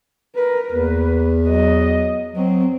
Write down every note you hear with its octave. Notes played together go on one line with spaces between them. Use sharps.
A#4 B4
E2 A#3 B4
F#3 D#5
F#3 C4